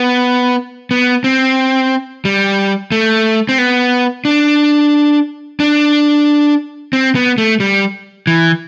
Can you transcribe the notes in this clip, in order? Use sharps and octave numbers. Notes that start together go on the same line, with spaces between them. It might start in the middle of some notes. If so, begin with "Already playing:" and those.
Already playing: B3
B3
C4
G3
A3
C4
B3
D4
D4
C4
B3
A3
G3
E3